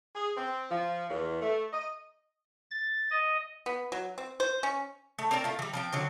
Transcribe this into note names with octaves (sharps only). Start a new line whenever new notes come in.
G#4
C4
F3
E2
A3
D#5
A6
D#5
B3
F#3
C4
C5
C#4
A3
C4 A#4 D5 A5
A3 F4
E3 G3
F3 C4 G5
D3 F#3 C4